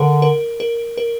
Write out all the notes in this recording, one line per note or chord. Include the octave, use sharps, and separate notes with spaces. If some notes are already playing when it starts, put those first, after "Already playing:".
Already playing: D3 A#4
A#4
A#4
A#4